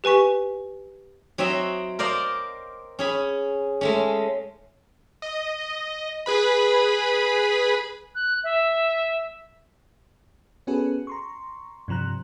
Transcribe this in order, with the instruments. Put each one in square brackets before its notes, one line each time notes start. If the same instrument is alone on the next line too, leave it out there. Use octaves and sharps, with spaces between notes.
[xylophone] G4 B4 G#5 C#6 B6
[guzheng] F#3 C4 F#4 D#5 E5
A#4 C5 D5 D#5 F5
C#4 G#4 B5
G#3 A3 C#4
[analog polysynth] D#5
G#4 B4 B5
[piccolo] F#6
E5
[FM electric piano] B3 C#4 F#4 G#4 A4 B4
A#5 C6 C#6
G2 C3 F3 A#5 F#6